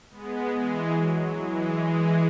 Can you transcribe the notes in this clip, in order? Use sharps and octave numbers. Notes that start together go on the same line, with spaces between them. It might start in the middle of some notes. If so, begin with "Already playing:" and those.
G#3 B3
E3 G#3
F#3
E3 G#3
E3 G#3